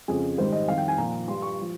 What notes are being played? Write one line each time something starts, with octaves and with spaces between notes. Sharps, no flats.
F2 C#3 F3 G#4
G#2 D#3 G3 C5
D#5
F2 D#3 G3 F5
G5
G#5
A#2 F3 A#5
G2 G3 C6
C#6
F3